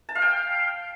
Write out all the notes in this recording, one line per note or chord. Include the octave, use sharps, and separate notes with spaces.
A5
F5
G5